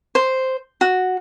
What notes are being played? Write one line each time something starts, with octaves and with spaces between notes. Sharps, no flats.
C5
F#4